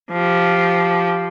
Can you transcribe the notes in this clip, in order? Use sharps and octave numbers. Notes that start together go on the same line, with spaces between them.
F3 G4